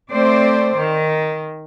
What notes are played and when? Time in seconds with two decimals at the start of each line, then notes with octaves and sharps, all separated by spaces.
0.12 A3 C4 C5 D5
0.78 D#3